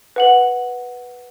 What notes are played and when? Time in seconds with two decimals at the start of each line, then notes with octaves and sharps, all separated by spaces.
0.16 B4 F#5 F#7